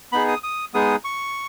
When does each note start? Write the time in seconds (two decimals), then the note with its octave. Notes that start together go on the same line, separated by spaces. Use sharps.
0.12 B3 D#4 G#4 B5
0.28 D#6
0.44 D#6
0.74 G#3 B3 D#4 G#4 D#6
1.04 C#6